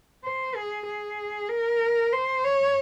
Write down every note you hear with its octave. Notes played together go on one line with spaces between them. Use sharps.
C5
G#4
G#4
A#4
C5
C#5